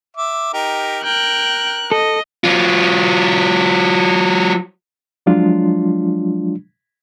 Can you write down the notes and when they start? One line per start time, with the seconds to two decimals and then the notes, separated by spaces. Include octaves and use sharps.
0.17 E5 D6
0.53 D#4 G4 A#4
1.04 A#4 G5 F#6
1.91 A4 D#5
2.44 F#3 F4
5.26 F3 F#3 G#3 D4 F4